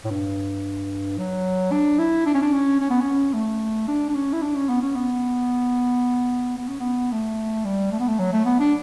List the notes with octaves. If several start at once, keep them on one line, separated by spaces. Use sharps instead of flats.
A2
G2
F#3
D4
E4
D4
C#4
D4
C#4
C#4
B3
C#4
A3
D4
D4
C#4
E4
D4
C#4
B3
C#4
B3
B3
C#4
B3
A3
G3
A3
B3
A3
F#3
A3
B3
D4